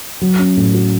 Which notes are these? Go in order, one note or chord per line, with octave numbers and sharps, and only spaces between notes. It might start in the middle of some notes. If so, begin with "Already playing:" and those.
F#3
C#4
A2
F#4